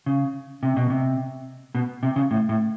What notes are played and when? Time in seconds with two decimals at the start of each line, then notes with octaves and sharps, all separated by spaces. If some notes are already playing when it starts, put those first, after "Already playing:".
0.06 C#3
0.63 C3
0.77 B2
0.90 C3
1.75 B2
2.03 C3
2.16 C#3
2.31 A2
2.49 A2